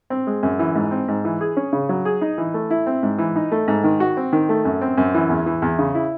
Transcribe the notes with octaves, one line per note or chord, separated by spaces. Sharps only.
C4
G#3
F#2
E3
G#2
C4
G#2
E3
G#4
C#4
C#3
F#3
G#4
D#4
E3
A3
E4
C4
G#2
E3
D#4
A3
G#2
D#3
F#4
C4
D#3
A3
F#2
C4
F#2
E3
E2
E3
E2
C#3
E4